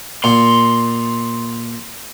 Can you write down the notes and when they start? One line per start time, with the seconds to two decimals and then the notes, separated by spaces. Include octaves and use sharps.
0.24 A#2 C6